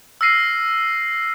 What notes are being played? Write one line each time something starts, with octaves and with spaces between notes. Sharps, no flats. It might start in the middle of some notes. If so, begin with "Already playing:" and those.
E6 F6 A#6 C7 D#7